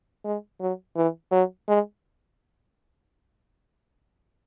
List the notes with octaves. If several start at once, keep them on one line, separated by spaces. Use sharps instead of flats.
G#3
F#3
E3
F#3
G#3